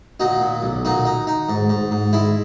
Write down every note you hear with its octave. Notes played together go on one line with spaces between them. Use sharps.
A#2 D#4 F#4
A#2
B1
A#2 D#4 F#4
D#4
D#4
G#2
G#2
G#2
G#3 E4